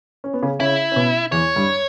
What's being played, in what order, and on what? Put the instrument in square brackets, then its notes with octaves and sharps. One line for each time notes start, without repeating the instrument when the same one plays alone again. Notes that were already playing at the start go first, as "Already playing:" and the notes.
[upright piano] C#4
B3
C#3 C#4
[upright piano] C#3 C#4 [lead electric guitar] E4
[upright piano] C#4
B2 B3
[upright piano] E2 E3 [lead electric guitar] C#5
[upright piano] G2 G3